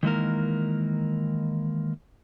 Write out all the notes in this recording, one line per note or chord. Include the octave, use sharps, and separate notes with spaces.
D#3 E3 G#3 A#3 A#4